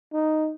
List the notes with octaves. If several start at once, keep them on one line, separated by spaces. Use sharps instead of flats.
D#4